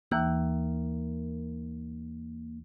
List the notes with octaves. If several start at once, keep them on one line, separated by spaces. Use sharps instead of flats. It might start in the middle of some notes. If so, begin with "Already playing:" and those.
D#2 E3 A#3 E6